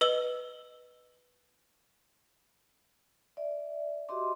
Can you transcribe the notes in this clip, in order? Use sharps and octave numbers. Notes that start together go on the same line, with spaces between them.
B4 D#5 E6 G7
D5 E5
F#4 G4 D#5 E5 C6 D6